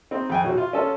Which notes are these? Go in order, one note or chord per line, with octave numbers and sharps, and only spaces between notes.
C4 D#4
F2 G5 G#5
B1 F#3
F4
C#4 F4 A4